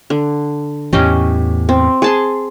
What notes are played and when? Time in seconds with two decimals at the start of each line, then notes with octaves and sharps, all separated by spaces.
0.10 D3
0.93 E2 A2 E3 C#4 G4 D#5
1.69 C4
2.02 G#4 A5 C6